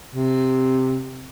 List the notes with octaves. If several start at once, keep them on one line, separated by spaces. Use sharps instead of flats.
C3